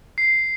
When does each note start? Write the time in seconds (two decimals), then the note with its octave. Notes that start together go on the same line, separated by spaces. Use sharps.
0.18 C7